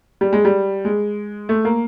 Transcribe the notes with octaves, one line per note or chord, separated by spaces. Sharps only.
G3
G#3
G3
G#3
A3
A#3